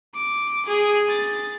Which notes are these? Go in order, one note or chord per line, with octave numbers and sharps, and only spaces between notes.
D6
G#4
A6